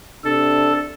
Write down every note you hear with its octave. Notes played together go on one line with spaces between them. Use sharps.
C3 D4 A4